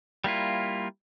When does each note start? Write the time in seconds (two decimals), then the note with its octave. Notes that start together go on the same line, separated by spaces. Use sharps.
0.24 G3 A#3 E4 F4